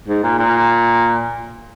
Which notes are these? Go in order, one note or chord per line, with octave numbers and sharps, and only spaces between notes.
G#2
A#2
A#2